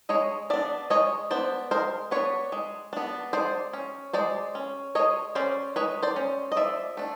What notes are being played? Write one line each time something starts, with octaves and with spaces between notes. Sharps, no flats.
G#3 C#5 D#5
B3 D4 D5 E5
G#3 C#5 D#5
B3 D4 C5 D5
G#3 A#4 C5
B3 D4 B4 C#5
G#3
B3 D4
G#3 C5 D5
C#4
G#3 C5 D5
C#4
G#3 C#5 D#5
C#4 C5 D5
G#3 B4 C#5
C5 D5
C#4
D#5
F3 D5 E5
A3 D4